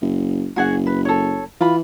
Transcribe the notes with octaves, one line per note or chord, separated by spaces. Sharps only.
F#1
F#1 F#4 G#4 F#5
B4
A4 C#5
E3 F4 B5